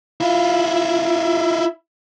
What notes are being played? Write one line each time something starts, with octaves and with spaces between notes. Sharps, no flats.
E4 F4